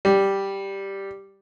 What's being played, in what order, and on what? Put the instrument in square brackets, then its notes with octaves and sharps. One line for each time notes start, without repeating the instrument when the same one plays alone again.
[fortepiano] G3